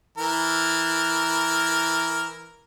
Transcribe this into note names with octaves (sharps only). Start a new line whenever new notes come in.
E3 A#4